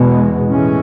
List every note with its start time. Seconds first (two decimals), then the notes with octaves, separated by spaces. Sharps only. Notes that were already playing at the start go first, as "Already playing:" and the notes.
Already playing: E2 B2 G#3 B3
0.48 A2 E3 G#3 C#4